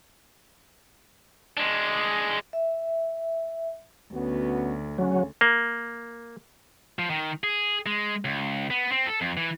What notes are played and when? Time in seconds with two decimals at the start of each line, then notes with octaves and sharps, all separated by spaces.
1.58 G#3 D4
2.53 E5
4.14 D2 B3 C#4 F#4
4.98 C#3 F#3 C#4
5.41 A#3
6.99 F3
7.10 D#3
7.44 G#4
7.86 G#3
8.25 C#2
8.70 B3
8.92 C4
9.06 A4
9.21 F2
9.37 E3